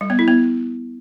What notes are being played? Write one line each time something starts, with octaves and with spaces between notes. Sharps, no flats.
G3
B3
E4
B3